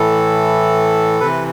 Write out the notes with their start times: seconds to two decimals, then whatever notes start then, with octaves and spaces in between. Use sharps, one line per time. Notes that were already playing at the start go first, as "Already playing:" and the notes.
Already playing: A2 E3 A4
1.20 C3 E3 B4